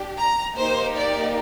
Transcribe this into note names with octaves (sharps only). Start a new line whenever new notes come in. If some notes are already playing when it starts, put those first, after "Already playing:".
Already playing: D4 G4
A#5
A#3 D#4 G4 C5
D5